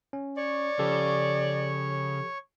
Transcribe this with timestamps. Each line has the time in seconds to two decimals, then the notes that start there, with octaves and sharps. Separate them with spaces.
0.13 C#4
0.37 C#5 D5 C#6
0.79 C#3 F3 G4 A4